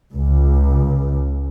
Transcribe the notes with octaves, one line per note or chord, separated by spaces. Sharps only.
C#2